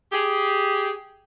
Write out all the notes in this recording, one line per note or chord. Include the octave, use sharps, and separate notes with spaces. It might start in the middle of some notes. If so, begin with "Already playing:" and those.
G4 G#4